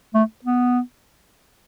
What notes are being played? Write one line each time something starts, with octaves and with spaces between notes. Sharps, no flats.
A3
B3